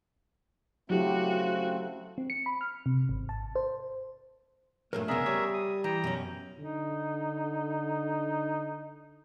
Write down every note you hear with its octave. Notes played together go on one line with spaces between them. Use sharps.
C#3 F#3 A3 C4 E4 F#4 G4
C4
C#7
B5
F6
C3
G#1
A5
C5
G2 A#2 F#3 A3 D4 A4 A#4
C2 F2 C#3 B3 D4 G#4 A#4 E5
G3 G4 C#5 G#5
D#6
E3 G5 A#5
F#2 B2 C#4
D3 D#4